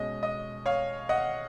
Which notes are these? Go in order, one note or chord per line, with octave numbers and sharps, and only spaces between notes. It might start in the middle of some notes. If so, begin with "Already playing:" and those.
Already playing: B2 G#3 C#4 D#5
D#5
C#5 F5
D#5 F#5